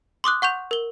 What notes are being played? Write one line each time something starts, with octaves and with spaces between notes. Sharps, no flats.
C6 D6 D#6 F#6
F#5 C#6 G6 F7
A#4 G7